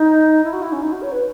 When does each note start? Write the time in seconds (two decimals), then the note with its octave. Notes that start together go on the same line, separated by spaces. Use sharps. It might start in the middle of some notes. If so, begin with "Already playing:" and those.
Already playing: D#4
0.44 E4
0.53 F#4
0.62 E4
0.72 C#4
0.82 D#4
0.92 F#4
1.02 C#5
1.12 B4